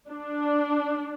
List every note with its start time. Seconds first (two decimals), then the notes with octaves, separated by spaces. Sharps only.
0.08 D4